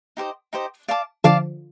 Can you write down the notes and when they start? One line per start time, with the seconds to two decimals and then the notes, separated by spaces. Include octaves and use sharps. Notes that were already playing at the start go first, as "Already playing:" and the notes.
0.17 D#4 G4 C5 D#5
0.53 D#4 G4 C5 D#5
0.88 D5 F5 A5 D6
1.24 D3 F3 D5 F5 A5 D6